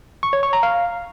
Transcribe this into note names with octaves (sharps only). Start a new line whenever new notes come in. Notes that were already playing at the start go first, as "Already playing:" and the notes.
C#6
C#5
C#6
A#5
F5